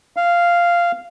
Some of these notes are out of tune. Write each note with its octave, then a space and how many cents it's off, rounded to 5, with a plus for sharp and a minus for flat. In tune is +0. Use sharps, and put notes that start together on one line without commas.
F5 -10